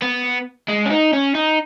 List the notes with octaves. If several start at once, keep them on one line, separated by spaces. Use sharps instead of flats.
B3
G#3
C#4
D#4
C#4
D#4